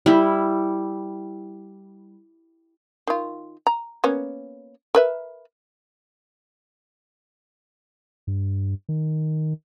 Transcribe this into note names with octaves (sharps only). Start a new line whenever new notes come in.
G3 E4
D#3 F4
A#5
A#3 B3 C#4
A#4 B4 E5
G2
D#3